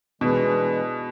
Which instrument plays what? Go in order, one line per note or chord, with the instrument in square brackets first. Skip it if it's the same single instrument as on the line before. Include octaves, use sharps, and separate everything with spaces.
[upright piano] B2 [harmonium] E3 G#3 D4 G#4 B4